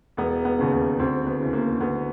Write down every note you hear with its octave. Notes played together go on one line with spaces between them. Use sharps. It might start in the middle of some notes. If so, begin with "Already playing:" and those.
E1 B3
B3
D#2 C#3
B3
D2 C4
B3
C#3 E3
A#3
D2 B3